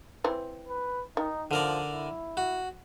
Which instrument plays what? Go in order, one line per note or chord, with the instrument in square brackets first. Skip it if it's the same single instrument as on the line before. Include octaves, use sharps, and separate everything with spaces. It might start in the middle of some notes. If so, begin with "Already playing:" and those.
[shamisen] E3 C4
[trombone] B4
[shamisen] D#3 [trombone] D#4
[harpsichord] D3 A#4 D5 [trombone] F3
[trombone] E4
[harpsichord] F#4